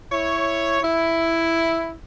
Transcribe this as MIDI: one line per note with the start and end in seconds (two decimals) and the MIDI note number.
0.12 0.82 64
0.12 0.82 73
0.82 1.93 64